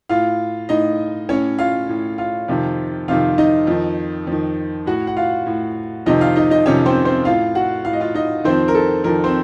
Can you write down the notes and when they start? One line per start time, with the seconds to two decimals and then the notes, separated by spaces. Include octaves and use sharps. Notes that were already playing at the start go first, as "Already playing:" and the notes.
0.09 A2 F4 F5
0.69 A2 D#4 D#5
1.29 A2 C#4 C#5
1.59 F4 F5
1.89 A2
2.18 F4 F5
2.48 F2 C3 D#3
3.08 F2 C3 D#3 F4 F5
3.38 D#4 D#5
3.67 F2 D#3
4.27 F2 D#3
4.86 A2 F#4 F#5
5.07 F#5
5.17 F4 F5
5.46 A2
6.06 F2 C3 D#3 D#4 D#5
6.21 F4 F5
6.36 D#4 D#5
6.51 D#4 D#5
6.66 F2 C3 D#3 C#4 C#5
6.86 C4 C5
7.05 C4 C5
7.25 A2 F4 F5
7.55 F#4 F#5
7.85 A2 F5
7.93 D#5
8.00 F4 F5
8.14 D#4 D#5
8.44 F2 D#3 C4 C5
8.68 A#4
8.75 A4
9.04 F2 D#3 A#4
9.24 C4 C5